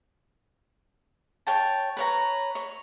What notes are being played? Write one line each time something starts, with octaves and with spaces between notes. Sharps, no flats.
C#5 G5 A5
B4 C#5 A#5
C#5